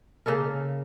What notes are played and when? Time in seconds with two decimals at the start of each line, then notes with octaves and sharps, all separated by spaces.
0.26 C#3 A#3 A4 A#4